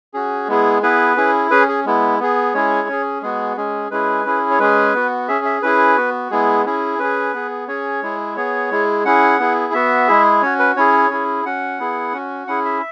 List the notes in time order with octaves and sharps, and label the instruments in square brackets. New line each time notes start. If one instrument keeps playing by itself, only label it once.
[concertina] C#4 F#4 G#4
G#3 B3 E4 G#4
B3 E4 G#4 B4
C#4 E4 G#4
C#4 G#4 B4
G#4
G#3 B3 E4
B3 G#4
G#3 C#4 E4 G#4 C#5
C#4 G#4
G#3 B3 F#4 G#4
G#3 C#4 G#4
G#3 C#4 E4 G#4 B4
C#4 E4 G#4
C#5
G#3 C#4 G#4 B4
B3 F#4
C#4 G#4 E5
E5
C#4 E4 G#4 B4
B3 F#4
G#3 B3 E4 G#4
C#4 E4 G#4
C#4 G#4 B4
B3 G#4
C#4 G#4 C#5
G#3 E4 G#4
B3 G#4 C#5
G#3 E4 G#4
C#4 E4 G#4 F#5
B3 E4 G#4
B3 F#4 E5
G#3 E4 G#4
C#4 F#4 C#5
B4
C#4 E4 G#4 C#5
C#4 E4 G#4
C#4 F#4 F#5
B3 E4 G#4
C#4 F#4
C#4 E4 G#4 F#5
E5